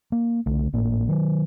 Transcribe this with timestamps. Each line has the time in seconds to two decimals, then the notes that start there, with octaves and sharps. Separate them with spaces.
0.12 A#3
0.46 C2 D3 A3
0.73 G#1 A2 A#3
1.09 D#3 F#3